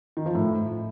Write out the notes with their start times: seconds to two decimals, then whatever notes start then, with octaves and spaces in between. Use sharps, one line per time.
0.17 D#3
0.26 F3
0.35 A2